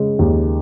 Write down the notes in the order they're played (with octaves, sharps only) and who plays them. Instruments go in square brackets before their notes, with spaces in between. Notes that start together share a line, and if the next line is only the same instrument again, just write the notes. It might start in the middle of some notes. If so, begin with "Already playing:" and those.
Already playing: [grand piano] C#3 G#3
D#2